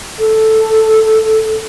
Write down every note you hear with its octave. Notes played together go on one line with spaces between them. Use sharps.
A4